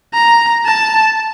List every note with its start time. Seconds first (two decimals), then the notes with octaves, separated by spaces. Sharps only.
0.14 A#5
0.66 A5